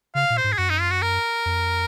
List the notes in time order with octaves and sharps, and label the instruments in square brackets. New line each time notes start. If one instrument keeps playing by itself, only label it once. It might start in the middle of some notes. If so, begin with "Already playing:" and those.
[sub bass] C#3 [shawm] F5
[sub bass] A#2
[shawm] C5
[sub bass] G#2
[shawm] G#4
[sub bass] F#2 [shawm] F#4
[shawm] D#4
F4
F#4
A#4
[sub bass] F2